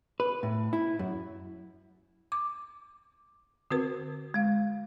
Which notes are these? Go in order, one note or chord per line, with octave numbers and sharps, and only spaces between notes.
B4
A2
E4
F#2
D6
D3 C4 F#4 A#4 B4
G#3 F5